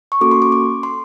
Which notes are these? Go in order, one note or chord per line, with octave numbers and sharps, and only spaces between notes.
C#6
A#3 C#4 F#4 A4 D6
C6
D6
D6
C6